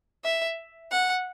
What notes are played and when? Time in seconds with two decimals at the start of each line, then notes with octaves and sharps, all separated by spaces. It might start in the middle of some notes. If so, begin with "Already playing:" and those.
0.24 E5
0.91 F#5